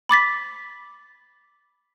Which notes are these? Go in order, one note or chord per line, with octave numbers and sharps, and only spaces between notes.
B5 D6 A6 B6